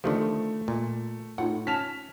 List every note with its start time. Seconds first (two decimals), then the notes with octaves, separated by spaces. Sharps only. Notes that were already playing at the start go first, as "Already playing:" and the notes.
0.04 D3 D#3 F3 A3
0.68 A#2
1.38 A2 D#4 F4 F#5
1.67 C#4 A5 F6 B6 F7